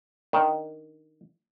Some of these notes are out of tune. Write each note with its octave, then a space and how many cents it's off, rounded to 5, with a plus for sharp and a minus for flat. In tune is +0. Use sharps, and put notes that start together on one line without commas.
D#3 +0 D4 +0